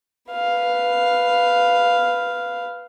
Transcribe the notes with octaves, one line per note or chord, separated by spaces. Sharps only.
B4 F5